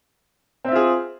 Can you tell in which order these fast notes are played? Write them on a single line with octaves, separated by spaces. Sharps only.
C4 E5 F4 G#4